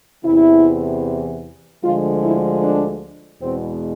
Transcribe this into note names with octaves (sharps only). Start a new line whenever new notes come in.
E2 C3 E3 E4
D2 D3 F3 G#3 F4
E4
D4
E2 B2 G#3 C4